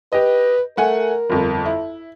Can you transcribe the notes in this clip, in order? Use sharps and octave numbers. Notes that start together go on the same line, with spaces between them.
G4 B4 D#5
A3 A#4 F#5 G#5
G1 F2
E4